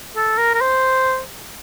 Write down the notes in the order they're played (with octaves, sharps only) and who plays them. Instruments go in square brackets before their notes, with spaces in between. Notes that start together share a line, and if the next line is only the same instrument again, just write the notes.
[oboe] A4
A#4
A#4
C5